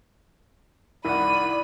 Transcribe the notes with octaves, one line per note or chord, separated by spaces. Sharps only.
C2 D#3 E4 D5 F#5 B5 D#7